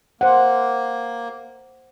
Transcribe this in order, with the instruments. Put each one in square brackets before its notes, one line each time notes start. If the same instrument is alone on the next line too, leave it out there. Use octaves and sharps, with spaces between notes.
[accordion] A#3 [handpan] C5 F#5